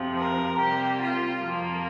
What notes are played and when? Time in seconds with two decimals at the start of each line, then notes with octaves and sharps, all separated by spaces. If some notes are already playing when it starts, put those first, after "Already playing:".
Already playing: F2 C3 F3
0.19 A#4
0.60 C3 G3 A#3 G4
1.01 F4
1.42 F2 F3 A#3